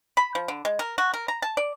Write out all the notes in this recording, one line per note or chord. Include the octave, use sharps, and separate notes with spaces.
B5
F3
D3
G#3
A#4
F#4
A#4
A#5
A5
D5